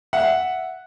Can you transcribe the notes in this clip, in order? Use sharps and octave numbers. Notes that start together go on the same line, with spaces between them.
E5 F#5